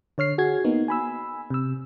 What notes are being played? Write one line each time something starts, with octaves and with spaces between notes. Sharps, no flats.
D3 C#5 F6 C7
F#4 G#4 G#6
A#3 B3 D#4
G#5 B5 E6
C3 E6